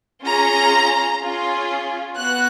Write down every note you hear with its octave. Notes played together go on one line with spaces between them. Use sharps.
C#4 F4 G#4 A#5
C#4 F4 G#4
B3 F#4 F#6